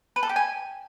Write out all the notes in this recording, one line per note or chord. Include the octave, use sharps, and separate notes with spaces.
B4
A4
G4
G#5